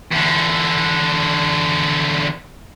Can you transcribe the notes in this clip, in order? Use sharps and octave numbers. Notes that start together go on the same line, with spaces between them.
E2 D3